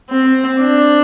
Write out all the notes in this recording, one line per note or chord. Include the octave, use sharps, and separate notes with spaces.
C4
D4